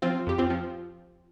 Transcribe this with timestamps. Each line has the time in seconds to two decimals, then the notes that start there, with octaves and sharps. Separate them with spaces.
0.02 F3 C4 F4
0.27 F2 G4
0.38 C4 F4
0.50 F3